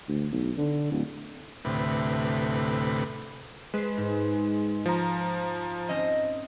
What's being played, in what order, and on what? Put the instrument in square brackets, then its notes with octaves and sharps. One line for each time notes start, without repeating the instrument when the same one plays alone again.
[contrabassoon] D2
B1
D3
D1
[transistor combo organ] D2 A2 C3 B4
[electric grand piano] G#3 [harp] B4 C7
[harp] G#2
[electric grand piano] F3 A#5
[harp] C4 C#4 D#5